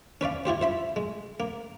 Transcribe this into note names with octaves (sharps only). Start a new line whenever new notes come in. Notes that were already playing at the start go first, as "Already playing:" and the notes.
C#4 B4 D5 F5
E4 F4 G4 C5
C5 E5 B5
G#3
A#3